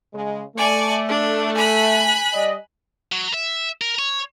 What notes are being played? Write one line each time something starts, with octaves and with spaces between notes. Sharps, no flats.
C#3 G#3
A3 D5 G#5 C#6
D4
G#5 B5 F#6
G3 D5 D#5
F#3
E5
A#4
C#5